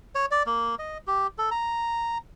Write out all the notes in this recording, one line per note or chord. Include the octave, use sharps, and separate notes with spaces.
C#5
D5
A#3
D#5
G4
A4
A#5